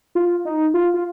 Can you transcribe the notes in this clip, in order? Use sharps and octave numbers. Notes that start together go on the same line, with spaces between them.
F4
D#4
F4
F4